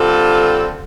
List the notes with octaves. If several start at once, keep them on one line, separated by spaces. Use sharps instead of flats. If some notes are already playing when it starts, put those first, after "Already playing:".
Already playing: D3 G3 C4 F4 A4